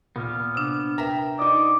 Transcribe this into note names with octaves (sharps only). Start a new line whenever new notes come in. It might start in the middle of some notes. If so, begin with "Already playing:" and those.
A#2 B3 F6
C3 D4
A#4 B4 E5 G5 A#5
D#4 D5 D6 D#6